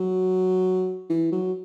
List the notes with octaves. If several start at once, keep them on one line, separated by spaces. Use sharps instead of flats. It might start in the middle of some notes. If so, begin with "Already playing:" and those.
Already playing: F#3
E3
F#3